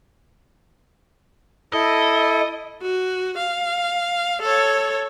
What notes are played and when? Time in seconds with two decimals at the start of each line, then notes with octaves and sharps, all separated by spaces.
1.73 E4 A4 D#5
2.82 F#4
3.38 F5
4.42 A4 C#5